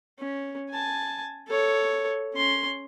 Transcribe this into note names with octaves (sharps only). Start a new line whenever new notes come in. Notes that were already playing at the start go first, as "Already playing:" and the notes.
C#4
G#5 A5
A4 C#5
C#4 C6